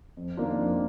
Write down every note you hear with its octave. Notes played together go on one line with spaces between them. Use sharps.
F2
D#3 A#3 D4 F4
F2